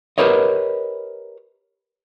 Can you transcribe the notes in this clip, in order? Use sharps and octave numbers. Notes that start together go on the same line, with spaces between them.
G4 A#4 B4 C#5 D#5